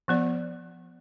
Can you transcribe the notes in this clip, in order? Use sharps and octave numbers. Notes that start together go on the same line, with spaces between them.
F3 B3 D5